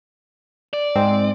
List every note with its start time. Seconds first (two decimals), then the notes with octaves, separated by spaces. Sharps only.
0.73 D5
0.95 G#2 G#3 C4